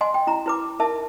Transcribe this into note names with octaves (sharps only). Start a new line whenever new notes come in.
D#5 F#5 G#5 C6
G5
E4 A#5
E4 B4 D6
D#4 A#4 E5 A5